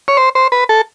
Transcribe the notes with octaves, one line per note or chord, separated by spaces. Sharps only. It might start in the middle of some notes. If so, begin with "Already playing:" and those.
C#5
C5
C5
B4
A4